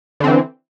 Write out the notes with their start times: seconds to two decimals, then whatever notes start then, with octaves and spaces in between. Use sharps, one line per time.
0.20 D3
0.24 C4
0.27 E3